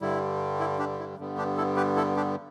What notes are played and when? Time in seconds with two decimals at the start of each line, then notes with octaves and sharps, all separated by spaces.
0.01 G2 D3 G3 E4
0.60 E4
0.79 D4 G4
0.99 E4
1.18 G2 D3 G3 B3
1.37 D4 G4
1.57 E4 A4
1.76 G4 B4
1.96 E4 A4
2.16 D4 G4